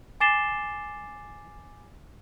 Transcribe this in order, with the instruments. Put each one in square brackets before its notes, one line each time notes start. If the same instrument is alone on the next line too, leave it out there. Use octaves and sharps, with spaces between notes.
[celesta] G#5 D6 A6 C7 E7 G7